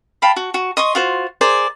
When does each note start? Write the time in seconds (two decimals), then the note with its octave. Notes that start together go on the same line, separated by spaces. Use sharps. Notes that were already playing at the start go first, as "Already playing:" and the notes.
0.22 F5 G5 A5 B5
0.36 F#4
0.54 F#4
0.77 D#5 C6 C#6 D#6
0.95 F4 F#4 C5
1.41 G#4 A#4 C5 D5